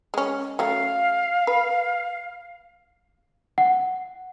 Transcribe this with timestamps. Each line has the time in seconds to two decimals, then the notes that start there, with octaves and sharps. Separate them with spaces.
0.14 G#3 C#4
0.59 F#3 A3 C#4 F5
1.47 B4
3.58 F#5